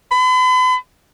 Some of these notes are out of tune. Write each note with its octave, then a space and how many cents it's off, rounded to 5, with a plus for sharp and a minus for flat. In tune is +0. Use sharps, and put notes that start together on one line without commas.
B5 +40